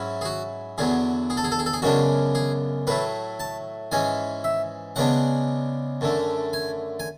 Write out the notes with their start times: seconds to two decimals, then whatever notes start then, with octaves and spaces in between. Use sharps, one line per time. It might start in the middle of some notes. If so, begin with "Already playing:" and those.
Already playing: G#2 F#3 C#4 E4
0.21 G#4
0.25 F#4
0.78 E2 D3 F#3 B3 G#4
1.30 G#4
1.37 A4
1.44 G#4
1.51 A4
1.59 G#4
1.66 A4
1.73 G#4
1.82 F#2 C#3 G#3 B3 D4 F#4
2.35 G#4
2.87 A2 F#3 A3 B4
3.40 A5
3.92 G#2 E3 G#3 C#4 G#5
4.44 E5
4.96 C#3 G#3 B3 D4 F#5
6.01 F#2 D3 A3
6.53 G#5
7.00 G#5